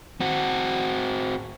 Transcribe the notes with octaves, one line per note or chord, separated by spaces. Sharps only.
C4 F#4